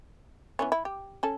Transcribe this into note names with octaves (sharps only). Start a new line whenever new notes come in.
E3 B3 C#4
E4
G4
C#4 A4